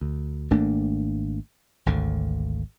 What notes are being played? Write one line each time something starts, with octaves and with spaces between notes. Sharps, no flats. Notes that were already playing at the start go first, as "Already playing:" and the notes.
D2
G#1 A3 A#3 D4
G#1 D2 D3